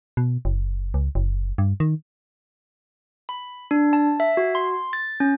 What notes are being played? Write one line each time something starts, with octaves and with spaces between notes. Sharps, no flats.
B2
F#1
C#2
F#1
G2
D#3
B5
D4
A5
E5
F#4
C6
A6
C#4